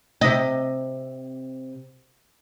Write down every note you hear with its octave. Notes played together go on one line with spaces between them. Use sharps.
C3 D#5